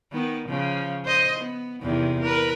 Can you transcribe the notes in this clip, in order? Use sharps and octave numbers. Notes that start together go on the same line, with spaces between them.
D#3 B3
C#3 F3
C5 D#5
B3
E2 C3 D#3
A#4 B4